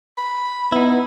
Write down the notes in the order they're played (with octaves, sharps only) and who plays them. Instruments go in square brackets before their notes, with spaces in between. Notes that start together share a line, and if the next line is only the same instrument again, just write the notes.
[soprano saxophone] B5
[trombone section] B3 [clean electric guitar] D#4 E4